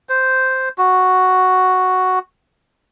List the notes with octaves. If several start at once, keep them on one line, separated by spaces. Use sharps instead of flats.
C5
F#4